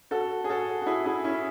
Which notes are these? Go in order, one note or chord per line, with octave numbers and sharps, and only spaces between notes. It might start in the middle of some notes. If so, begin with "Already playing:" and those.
F#4 A4
G#4
F#4 A4
F#4
E4 G#4
E4 G#4
C#4 E4